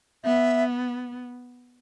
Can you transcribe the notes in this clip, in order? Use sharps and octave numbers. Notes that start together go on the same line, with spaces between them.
B3 E5